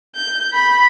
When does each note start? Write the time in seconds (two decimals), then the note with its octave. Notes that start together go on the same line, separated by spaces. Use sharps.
0.15 G6
0.53 B5